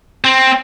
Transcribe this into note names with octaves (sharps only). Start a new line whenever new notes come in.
C4